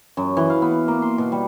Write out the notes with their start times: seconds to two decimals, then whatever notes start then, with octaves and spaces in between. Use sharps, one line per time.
0.17 F#2
0.37 E3
0.50 F5
0.62 B3
0.88 A#3
1.02 C6
1.18 B2
1.32 G3